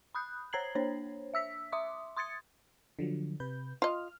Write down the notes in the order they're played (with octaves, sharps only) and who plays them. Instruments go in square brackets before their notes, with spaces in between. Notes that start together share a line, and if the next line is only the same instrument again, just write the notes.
[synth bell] B5 D#6 F#6 G6
C5 C#5 A#5 G#6 C7 F#7
A#3 D4 C5 C#5
E5 E6 B6
E5 C6 D6 D#6
C6 D#6 G#6 A6 C#7
[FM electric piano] D3 F3 F#3
C3 B4 G6
[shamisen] F4 D#5 [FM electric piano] F6